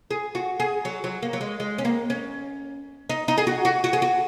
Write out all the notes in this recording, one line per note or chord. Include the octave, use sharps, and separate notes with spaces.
G#4
F#4
G#4
F#3
F#3
A#3
F#3
G#3
G#3
C#4
A#3
C#4
D#4
D#4
G#4
F#4
F#4
F#4
G#4
F#4